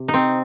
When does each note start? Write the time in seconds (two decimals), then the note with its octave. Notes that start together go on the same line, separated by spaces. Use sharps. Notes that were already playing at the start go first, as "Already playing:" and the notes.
Already playing: C3
0.08 D#4
0.14 C4